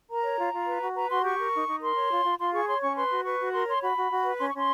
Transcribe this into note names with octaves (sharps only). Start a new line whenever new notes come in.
A#4 A#5
C#5
F4
F4
B4
F#4
B4 A#5
F#4 C6
G4 C#6
A#4
D#4
D#4
A#4 C6
C#5
F4
F4
F4 C6
G#4 C#6
C#5 C6
C#4 C#6
B4 C6
F#4
B4 C#6
F#4
A#4 C6
C#5 C6
F#4 B5
F#4
F#4
B4
C#4 C6
C#6
C#4 C6